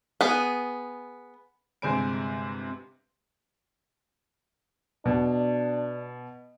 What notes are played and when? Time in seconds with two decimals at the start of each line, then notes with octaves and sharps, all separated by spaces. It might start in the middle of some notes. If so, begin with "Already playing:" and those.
0.21 B3 G#4
1.82 G1 C3 G#3 C5 G#5 D7
5.05 B2 D4